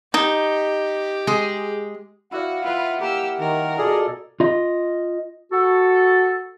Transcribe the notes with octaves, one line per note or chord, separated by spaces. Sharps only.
D#4 G4
G#3 G#4
E4 F#4 D5 F5 F#5
E4 F4 B4 E5
A#3 G4 E6
D#3 A#4
B2 F4 G#4 A4 D5 G#5
F4 D#5
F#4 A4